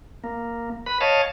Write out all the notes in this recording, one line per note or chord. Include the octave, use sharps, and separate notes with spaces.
A#3
B4 B5
C#5 D#5 F5 A5